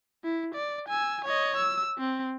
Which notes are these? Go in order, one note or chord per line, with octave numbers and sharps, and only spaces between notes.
E4
D5
G#5 E6
C#5 D#5
E6
C4